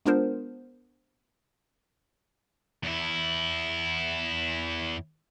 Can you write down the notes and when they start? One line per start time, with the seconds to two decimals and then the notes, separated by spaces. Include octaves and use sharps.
0.05 G#3 B3 D4 F4 A#4 C5
2.84 E2 E4